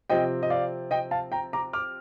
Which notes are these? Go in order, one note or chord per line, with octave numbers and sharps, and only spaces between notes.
C3 F3 C4 D#5 G5
D#5
D5 F5
D#5 G5
F5 A5
G5 A#5
A#5 D6
D6 F6